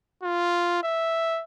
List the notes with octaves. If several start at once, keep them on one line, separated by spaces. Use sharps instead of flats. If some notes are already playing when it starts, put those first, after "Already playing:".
F4
E5